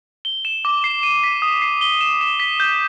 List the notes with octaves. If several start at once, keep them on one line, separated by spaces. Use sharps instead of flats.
G7
E7
D6
C7
D#7
B6
D#6
C7
G7
E7
E7
B6
G6